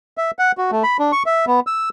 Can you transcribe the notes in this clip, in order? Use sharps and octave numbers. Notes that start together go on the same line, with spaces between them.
E5
F#5
F#4
A3
B5
D4
C#6
E5
B3
E6